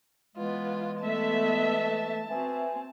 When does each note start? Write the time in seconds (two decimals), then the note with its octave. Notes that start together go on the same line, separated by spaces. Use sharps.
0.36 E3 G#3 B3 F4
1.02 A3 B3 E5 A5
2.29 B3 C4 F#4 E5 G#5